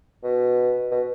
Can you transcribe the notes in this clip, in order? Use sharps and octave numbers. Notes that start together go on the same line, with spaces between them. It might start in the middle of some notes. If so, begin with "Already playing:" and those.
B2
B2